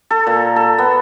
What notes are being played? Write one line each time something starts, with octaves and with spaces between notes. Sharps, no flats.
A4
A#2
A4
B3